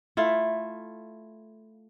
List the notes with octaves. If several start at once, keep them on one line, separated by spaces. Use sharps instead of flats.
A3 E4 F4